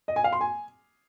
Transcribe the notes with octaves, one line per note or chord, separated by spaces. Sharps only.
D#5
G#5
F5
C6
G#5